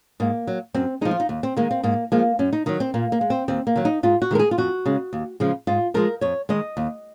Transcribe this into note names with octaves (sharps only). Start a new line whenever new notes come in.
G#2 A#3
F#3
F#2 C4
F3 G#3 D#4
F4
D#4
D#2
C4
D#3 G#3 A#3
C4
G#2 A#3
F3 G#3 A#3
F#2 C#4
D#4
D#3 F#3 D#4
C4
A#2 A#3
A#3
G#3
C4
D#2 C4
A#3
D#3 F#3
D#4
G#2 F4
F#4
D#3 G#3 A#4
G#4
F4
F2 F#4
C#3 G#3
D#2
C#3 F3 G#3
G#2 F4
F3 G#3 A#4
F2 C#5
D#3 G#3 D#5
D#2